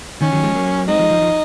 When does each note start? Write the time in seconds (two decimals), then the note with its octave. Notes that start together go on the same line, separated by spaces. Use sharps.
0.22 D#3 C#4
0.32 D#3 F#3
0.43 F3 G#3
0.55 F#3 A#3
0.88 G#3 C4 D#4
0.99 F3 G#3
1.10 F3
1.22 F3